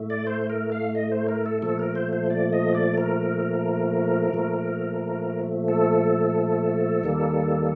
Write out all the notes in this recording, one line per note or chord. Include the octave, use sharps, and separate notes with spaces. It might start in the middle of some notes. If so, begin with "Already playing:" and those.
Already playing: A2 A3
D5
C5
A#4
F5
D#5
C5
A#4
A4
A#2 F3 A3 A4
A#4
C5
C5
D5
D#5
D5
A#4
A#2 F3 A3
A4
D#2 D#3 G3 A#3